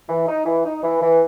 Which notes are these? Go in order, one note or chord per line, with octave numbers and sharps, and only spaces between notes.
E3
D#4
E3
D#4
E3
E3